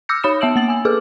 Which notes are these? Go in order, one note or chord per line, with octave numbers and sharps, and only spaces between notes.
D6 E6 F6 G6 A#6 C#7
D#4 C#5 B5 D#6 C#7 E7
B3 E5 A5 E6 D7 F#7
A#3 A6 F#7
G#5 E6
G#4 A4 B4 D6 F6